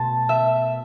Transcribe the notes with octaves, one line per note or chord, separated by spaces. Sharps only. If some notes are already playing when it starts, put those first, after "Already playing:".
Already playing: B2 A3 A5 C6
E5